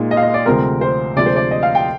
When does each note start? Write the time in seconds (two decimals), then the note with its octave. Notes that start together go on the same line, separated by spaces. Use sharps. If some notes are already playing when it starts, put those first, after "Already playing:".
Already playing: A#2 G#3 D#4
0.11 D#5
0.17 F5
0.23 D#5
0.34 D5
0.46 D2 C3 F3 G#3 C4 A#4
0.81 C5
1.16 D2 C3 F3 G#3 D5
1.26 C5
1.36 D5
1.51 D#5
1.63 F5
1.75 G5